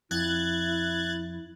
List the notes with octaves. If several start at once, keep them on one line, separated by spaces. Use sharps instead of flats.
F2 E4 F#6 G#6 A6